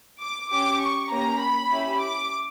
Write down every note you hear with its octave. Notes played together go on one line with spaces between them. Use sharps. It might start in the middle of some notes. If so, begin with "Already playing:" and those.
D6
C#4 G4 D6
C#6
A#3 C#4 G4 A#5
B5
C#4 E4 G4
D6